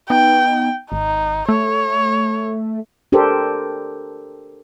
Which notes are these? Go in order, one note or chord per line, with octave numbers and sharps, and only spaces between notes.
B3 D#4 G5
G#1 D#4
A3 C#5
D4 G4 A4 A#4 C5